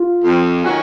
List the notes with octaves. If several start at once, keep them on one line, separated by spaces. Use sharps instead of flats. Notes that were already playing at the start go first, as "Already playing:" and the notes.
Already playing: F4
F2
D#3 F#3 C#4 F#4